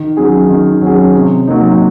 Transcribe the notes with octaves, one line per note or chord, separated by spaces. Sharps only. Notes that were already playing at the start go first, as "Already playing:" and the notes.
Already playing: D#3
F#3 C#4 G#4
D#3
F#3 C#4 G#4
C3
F#3 A#3 D#4